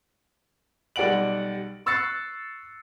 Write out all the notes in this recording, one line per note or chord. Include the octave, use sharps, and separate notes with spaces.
B1 G3 D5 F#5 D7 F#7
C#6 E6 F#6 A6 C7 C#7